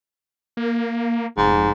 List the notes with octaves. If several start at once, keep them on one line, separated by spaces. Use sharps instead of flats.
A#3
F1 G#2